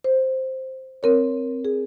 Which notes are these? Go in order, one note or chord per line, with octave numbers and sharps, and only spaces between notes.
C5
C4 A#4 C#5
G#4